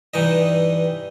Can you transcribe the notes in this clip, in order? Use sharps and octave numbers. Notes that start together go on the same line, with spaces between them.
G2 E3 D#4 D#5